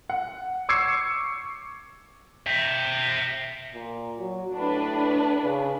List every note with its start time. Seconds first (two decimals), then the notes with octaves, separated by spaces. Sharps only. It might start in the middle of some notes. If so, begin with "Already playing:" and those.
0.10 F#5
0.69 C#6 D6 E6 G#6 C7 C#7
2.47 E5 G5
3.74 A#2
4.18 F#3
4.55 A2 D4 B4
5.43 C#3